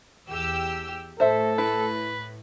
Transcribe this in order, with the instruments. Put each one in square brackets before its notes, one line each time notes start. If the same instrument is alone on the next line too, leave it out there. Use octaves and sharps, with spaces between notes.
[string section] E2 G4 E6
[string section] A2 [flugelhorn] A4 [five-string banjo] C5 E5
[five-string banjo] E4 [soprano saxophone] B4